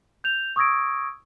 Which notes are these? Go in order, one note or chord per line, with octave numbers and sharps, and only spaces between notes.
G6 F7
C#6 D#6 E6 G#6 A#6 D7